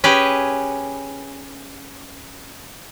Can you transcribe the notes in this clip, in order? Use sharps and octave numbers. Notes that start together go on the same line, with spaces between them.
C#4 G4 G#4 B4